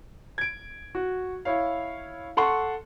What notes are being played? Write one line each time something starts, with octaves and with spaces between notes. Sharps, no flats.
G#6 D7
F#4
E4 C#5 F5
A4 F#5 C6 C#6